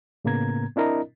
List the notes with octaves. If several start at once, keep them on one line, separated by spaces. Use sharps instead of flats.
A2 C#3 A#3 B3 A#5 G#6
C4 D4 E4 A#4 D#5 A#5